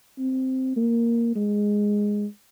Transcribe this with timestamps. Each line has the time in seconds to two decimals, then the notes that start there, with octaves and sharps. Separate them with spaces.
0.19 C4
0.76 A#3
1.36 G#3